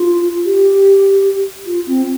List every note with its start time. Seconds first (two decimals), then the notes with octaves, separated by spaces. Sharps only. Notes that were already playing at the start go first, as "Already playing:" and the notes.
Already playing: F4
0.45 G4
1.66 F4
1.87 C4